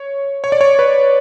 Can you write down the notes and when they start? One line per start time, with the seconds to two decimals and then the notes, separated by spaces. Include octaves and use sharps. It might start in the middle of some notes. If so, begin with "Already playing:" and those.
Already playing: C#5
0.44 C#5
0.52 D5
0.61 C#5
0.79 B4